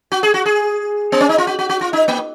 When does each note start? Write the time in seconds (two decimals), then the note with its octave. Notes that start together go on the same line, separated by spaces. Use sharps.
0.12 F#4
0.23 G#4
0.34 F#4
0.46 G#4
1.12 B3
1.21 C#4
1.29 D#4
1.38 F4
1.47 F#4
1.59 F#4
1.69 F#4
1.81 F4
1.93 D#4
2.08 A#3